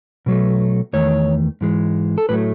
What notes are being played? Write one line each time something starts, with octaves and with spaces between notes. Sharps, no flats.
B2 F#3 A3
E2 D#3 A3 C#5
G#2 E3 G#3
A4
A2 F#3 A3 B4